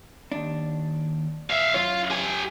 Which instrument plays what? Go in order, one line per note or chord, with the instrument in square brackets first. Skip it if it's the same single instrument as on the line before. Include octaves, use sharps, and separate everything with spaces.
[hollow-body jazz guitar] D#2 D4
[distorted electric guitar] E5 F5
[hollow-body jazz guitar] F#2 C#3 C#5 [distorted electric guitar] F4
[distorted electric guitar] G4 G#5